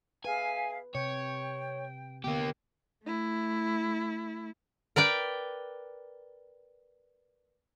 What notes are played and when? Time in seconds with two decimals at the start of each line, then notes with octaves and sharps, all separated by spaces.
0.25 G#4 B4 E5 F5 G#5
0.95 C3 C#5 G5
2.24 D3 A#3 B3 G4
3.03 A3 E4
4.96 A#4 B4 D5 G5